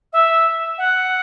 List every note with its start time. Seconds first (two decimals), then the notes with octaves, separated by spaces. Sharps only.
0.12 E5
0.78 F#5